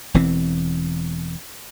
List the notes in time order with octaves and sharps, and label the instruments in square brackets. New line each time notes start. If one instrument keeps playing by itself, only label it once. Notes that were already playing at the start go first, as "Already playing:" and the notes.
[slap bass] E1 E2 E3 C4